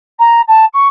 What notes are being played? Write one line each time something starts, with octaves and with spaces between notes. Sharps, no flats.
A#5
A5
C#6